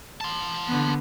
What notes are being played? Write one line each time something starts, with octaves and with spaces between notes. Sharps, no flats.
A5 C6
D3 B3